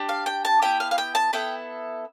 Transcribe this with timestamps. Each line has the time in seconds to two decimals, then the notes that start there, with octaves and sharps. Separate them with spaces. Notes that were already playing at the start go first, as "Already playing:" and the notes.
Already playing: D4 G4
0.09 F5
0.26 G5
0.45 A5
0.62 B3 E4 G4 G5
0.80 F5
0.91 F5
0.98 G5
1.15 A5
1.33 B3 E4 A4 G5